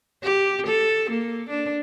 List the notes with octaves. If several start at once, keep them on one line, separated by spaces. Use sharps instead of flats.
G4
A4
A#3
D4